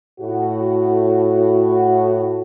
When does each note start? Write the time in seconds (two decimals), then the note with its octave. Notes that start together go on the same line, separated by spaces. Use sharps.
0.20 A2 F#4